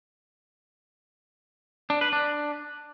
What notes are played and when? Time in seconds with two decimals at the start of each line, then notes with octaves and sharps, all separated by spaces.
1.90 D4
2.01 B4
2.13 D4